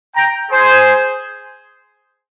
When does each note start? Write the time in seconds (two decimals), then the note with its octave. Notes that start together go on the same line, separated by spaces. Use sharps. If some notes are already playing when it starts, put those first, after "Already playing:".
0.15 G5 A#5
0.50 G#4 C5